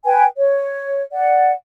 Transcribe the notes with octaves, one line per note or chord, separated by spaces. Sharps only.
B4 G5 G#5
C#5
D5 F#5